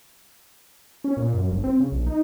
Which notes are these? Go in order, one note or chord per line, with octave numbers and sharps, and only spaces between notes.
C#4
A#2
F#2
G1
C4
C#3
A#1
D#4